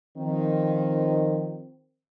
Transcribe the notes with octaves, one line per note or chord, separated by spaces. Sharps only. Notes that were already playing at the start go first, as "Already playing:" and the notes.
D#3 F3 C4